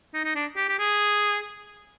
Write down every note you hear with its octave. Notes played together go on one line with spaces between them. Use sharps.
D#4
D#4
D4
G4
G4
G#4